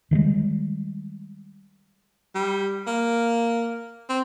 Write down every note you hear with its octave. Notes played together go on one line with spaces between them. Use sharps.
D#3 E3 G3 G#3
G3
A#3
C4